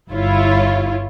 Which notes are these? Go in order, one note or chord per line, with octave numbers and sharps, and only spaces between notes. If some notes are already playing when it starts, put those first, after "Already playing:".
G1 E4 F4 C#5